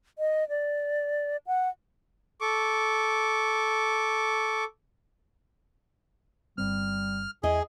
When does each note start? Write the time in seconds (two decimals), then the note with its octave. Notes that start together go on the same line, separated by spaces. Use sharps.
0.18 D#5
0.49 D5
1.47 F#5
2.41 A4 C#6 D6
6.58 G1 G3 C4 F6
7.43 E2 E4 G#4 D#5